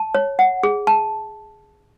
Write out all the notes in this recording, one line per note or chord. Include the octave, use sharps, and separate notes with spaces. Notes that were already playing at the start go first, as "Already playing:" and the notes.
Already playing: A5
C#5
F#5
G#4
A5